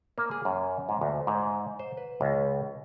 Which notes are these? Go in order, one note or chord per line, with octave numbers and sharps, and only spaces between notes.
A#3
G#4
F#2
G#2
D2
G#2
C5
B4
C#2